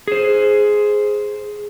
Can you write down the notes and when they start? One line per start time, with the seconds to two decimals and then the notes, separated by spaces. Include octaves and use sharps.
0.08 G#4 C5